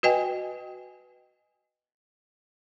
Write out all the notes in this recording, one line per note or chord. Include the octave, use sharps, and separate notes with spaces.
F#4 B4 D#5 G5 G#5